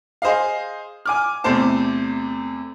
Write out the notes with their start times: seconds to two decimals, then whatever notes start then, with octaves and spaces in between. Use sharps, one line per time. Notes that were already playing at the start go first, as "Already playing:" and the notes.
0.22 G#4 C5 D#5 F5
1.06 G#5 D6 F6
1.44 E2 C3 A3 C5 A5